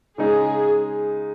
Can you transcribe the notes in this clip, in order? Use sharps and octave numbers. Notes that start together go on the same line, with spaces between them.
C#3 G#3 D#4 G#4